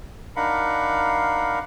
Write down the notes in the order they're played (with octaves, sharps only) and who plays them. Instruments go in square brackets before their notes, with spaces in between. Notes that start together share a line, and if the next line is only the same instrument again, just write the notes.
[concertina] D4 D#4 A#4 F5 F#5 B5